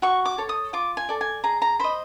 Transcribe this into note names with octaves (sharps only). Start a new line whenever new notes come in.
F#4 C#6
D6
A4 C#5
D#6
F4 D6
G#5
A4 D5
G#5
G#4 A#5
A#5
C5 D#5 B5